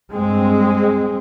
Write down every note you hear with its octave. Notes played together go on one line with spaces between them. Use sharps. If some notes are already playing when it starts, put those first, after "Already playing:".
G2 G#3 C4